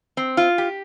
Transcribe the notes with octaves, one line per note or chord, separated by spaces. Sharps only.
C4
F4
G4